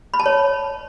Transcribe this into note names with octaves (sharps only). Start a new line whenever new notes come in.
B5
A5
C#5